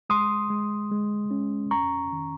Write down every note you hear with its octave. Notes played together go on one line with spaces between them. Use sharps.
G#3 C6 D#6
G#3
G#3
C#4
F2 A#5 C#6
D#3